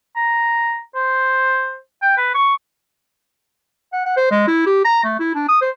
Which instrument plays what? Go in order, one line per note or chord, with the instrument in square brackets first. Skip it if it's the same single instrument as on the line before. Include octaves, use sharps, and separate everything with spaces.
[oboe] A#5
C5
G5
B4
C#6
[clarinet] F#5
F#5
C5
G#3
E4
G4
A#5
A3
E4
D4
D#6
C5